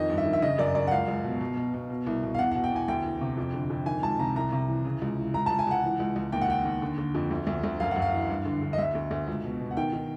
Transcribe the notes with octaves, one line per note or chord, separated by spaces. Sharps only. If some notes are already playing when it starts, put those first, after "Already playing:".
Already playing: F2 D#3 D#5
G2
E5
D#3
E5
C#3 D#5
F#2 D5
F#2 D5
F#5
C#2 F5
C#2
B2
B2
B2
B2
B2
C2
B2
F5
E2 F#5
F#5
B2
G5
E2 G#5
D2 G5
E3
C3
F2
D3
F2
D#3 G#5
C#2 A5
C3 A#5
C2 A#5
C3
E3
C#3
C#2
E3
C#2 A#5
A5
C#2
G#5
C#2 F#5
E3
C#2
C#2
D#2 G5
F#5
D#3 G5
D#2
D3
D3
F2
D2
D2
D2
F#2 F5
F#2 F#5
F5
E3
G2
D3
D3
D#5
D2 E5
D2
D2
C#2
B2
B2
F#5
D#3 G5
D#3